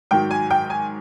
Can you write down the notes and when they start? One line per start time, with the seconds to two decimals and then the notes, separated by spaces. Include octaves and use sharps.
0.11 G#2 D#3 F#3 G5
0.31 G#5
0.50 G5
0.70 G#5